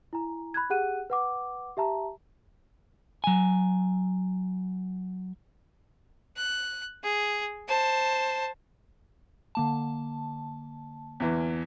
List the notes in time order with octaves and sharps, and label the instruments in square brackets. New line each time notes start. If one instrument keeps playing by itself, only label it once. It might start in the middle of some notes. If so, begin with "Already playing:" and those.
[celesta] E4 G#5 A#5
B5 F#6 G#6
G4 G#4 F#5 F#6 D#7
B4 F#5 D6
G4 E5 A5 A#5
[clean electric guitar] F#3 G#5
[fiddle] F#6
G#4
C5 A5
[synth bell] D3 A#3 A5
[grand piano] E2 E3